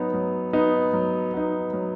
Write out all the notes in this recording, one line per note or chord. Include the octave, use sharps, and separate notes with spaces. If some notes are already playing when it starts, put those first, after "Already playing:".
Already playing: F#3 B3 D#4
F#3
B3 D#4
F#3
B3 D#4
F#3